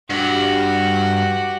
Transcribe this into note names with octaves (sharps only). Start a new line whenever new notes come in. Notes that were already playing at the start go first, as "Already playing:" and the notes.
G2 F#4 G4